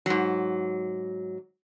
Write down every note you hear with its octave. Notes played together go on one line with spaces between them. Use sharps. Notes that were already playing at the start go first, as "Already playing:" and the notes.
G#2 F#3